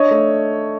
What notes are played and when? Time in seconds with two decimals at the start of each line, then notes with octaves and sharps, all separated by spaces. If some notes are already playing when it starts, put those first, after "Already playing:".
Already playing: D4 C#5 D#5
0.11 A3